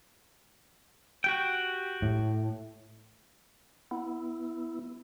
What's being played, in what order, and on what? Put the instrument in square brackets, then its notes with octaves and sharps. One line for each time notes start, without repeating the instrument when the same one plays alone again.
[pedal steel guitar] F#4 G4 G5
[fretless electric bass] A2
[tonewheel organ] B3 E4